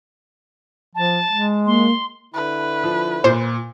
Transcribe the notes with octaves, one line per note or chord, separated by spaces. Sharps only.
F3 A5
G#3
A#3 C6
D3 E4 B4
F3
A#2 C5